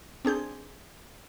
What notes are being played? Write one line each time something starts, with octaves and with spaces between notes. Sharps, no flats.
C4 D4 G#4 G6